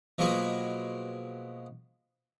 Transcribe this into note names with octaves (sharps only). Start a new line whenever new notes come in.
B2 F3 F#3 G#3 A#3 B3